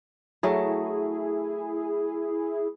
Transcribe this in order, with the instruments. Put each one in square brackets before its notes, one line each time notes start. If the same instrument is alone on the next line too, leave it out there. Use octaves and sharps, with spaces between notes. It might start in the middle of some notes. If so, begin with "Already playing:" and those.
[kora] F#3 A3 [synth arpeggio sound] E4 G#4